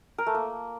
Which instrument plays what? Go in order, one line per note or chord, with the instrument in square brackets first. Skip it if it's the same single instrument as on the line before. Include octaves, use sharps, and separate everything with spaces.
[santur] A#4
A3
A#3